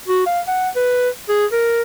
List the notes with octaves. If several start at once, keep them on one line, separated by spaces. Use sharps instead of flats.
F#4
F5
F#5
B4
G#4
A#4